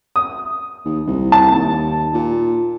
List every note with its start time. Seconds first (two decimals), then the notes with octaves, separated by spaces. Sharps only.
0.16 D#6
0.85 D#2
1.07 C2
1.32 A5
1.52 D#2
2.14 A#2